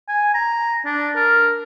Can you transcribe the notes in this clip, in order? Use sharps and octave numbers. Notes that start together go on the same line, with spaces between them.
G#5
A#5
D4
A#4